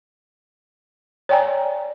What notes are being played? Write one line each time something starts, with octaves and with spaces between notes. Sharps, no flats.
C#5 D5 G5 G#5 A#5